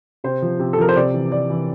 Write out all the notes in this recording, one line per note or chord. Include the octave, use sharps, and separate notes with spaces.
C3 C5
F3
C3
A4
F3 A#4
C5
C3 D5
E3
C3 D5
E3